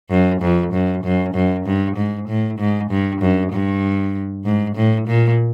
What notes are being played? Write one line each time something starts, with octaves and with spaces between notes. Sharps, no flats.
F#2
F2
F#2
F#2
F#2
G2
G#2
A2
G#2
G2
F#2
G2
G#2
A2
A#2